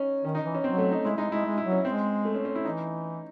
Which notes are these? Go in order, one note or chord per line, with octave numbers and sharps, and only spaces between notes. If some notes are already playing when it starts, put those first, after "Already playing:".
Already playing: C#4 D#4
D#3 C#4
D#4
E3
C#4
F#3 C4
A3
D#4
G#3 E4
G#3 D#4
G#3 E4
G#3
E4
F#3
C#4
G#3 C4
A3
C#4
C#4
E4
E3 D#4